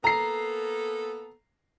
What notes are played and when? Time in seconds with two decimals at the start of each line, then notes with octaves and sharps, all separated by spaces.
0.04 A#3 B3 A4 A#5 C7